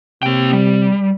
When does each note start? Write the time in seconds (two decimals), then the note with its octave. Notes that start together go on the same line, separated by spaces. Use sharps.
0.23 C3 A#3 G5
0.53 G3